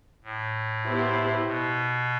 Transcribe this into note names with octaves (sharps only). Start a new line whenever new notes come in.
A2
B3 E4 G4 C5
B2